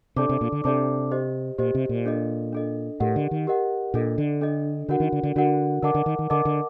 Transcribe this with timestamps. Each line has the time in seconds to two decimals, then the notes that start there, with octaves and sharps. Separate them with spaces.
0.16 C3 D4 A4 D5 A5 D6
0.29 C3
0.41 A#2
0.52 D3
0.64 C3 D4 A4 D5 A5 D6
1.11 G4 C5 D#5
1.58 A#2 G4 C5 D#5
1.75 C3
1.89 A#2
2.06 D4 A4 D#5
2.53 D4 A4 D#5
3.00 A2 G4 A#4 D#5 F#5
3.16 D3
3.31 D#3
3.47 G4 A#4 D#5 F#5
3.94 A#2 D4 A4 D#5
4.18 D3
4.41 D4 A4 D#5
4.88 D3 D4 F#4 A#4 F#5
5.00 D#3
5.12 D3
5.23 D3
5.36 D3 D4 F#4 A#4 F#5
5.83 D3 A#4 D#5 F#5 A5 D6
5.95 D3
6.06 D#3
6.19 D#3
6.30 D3 A#4 D#5 F#5 A5 D6
6.45 D3